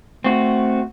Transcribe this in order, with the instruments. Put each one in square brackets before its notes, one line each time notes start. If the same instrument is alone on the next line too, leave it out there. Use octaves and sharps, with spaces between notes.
[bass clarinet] A3 [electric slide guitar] C4 F#4